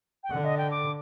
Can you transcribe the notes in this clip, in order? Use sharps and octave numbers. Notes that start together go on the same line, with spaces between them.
G5
D3 F#5
D#5
G5
D6